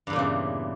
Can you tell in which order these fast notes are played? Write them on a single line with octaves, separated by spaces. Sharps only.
G2 E2 A#2 C#3 E3